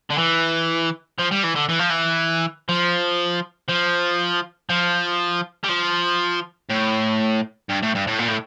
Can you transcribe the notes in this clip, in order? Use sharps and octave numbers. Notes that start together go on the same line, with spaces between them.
D3
E3
F3
G3
E3
D3
E3
F3
E3
F3
F3
F3
G3
F3
A2
G2
A2
G2
A2
A#2
A2